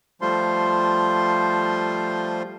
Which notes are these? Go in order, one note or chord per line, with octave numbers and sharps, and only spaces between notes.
F3 G3 A3 F4 C5 C6